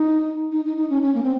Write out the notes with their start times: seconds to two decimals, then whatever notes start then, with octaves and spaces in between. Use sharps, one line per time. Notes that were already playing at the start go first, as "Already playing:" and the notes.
Already playing: D#4
0.52 D#4
0.65 D#4
0.77 D#4
0.90 C#4
1.02 C#4
1.15 A#3
1.23 C4